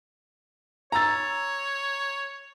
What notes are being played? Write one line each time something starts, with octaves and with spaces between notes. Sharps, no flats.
C#5 A#5 E6 A6